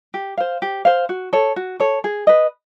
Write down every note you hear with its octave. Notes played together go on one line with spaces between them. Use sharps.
G4
C5 F5
G4
C5 F5
F#4
A4 C#5
F#4
A4 C#5
G#4
B4 D#5